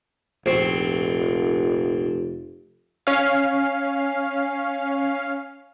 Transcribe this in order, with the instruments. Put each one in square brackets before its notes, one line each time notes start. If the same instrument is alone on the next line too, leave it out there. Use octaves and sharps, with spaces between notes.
[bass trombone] F1 [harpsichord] A#1 C4 C#6
[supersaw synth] C#4 F5